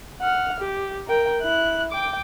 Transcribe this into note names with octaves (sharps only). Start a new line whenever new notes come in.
F#5 F6
G4
A#4 G5
E4 F#6
G5 D6